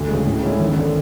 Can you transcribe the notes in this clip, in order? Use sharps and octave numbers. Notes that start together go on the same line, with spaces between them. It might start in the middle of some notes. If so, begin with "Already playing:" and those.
Already playing: D2
C#3 G#3
A2
G#3 C#4 E4
G#1
D3